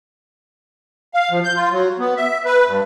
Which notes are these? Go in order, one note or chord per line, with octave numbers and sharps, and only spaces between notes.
F5
F3
G6
F4
F#3
B3
E5
B4
G2